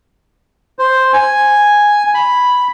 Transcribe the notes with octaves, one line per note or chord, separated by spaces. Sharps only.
C5
G#5
B5